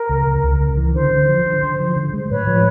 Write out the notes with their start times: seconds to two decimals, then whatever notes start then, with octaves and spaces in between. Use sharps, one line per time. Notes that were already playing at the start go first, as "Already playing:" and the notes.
Already playing: A#4
0.09 C#2
0.26 C#2
0.43 C#2
0.60 C#2
0.77 E3
0.94 D3 C5
1.11 D3
1.28 F3
1.46 D3
1.63 D3
1.80 F3
1.96 D3
2.14 G#3
2.30 A2 B4 C#5
2.47 F3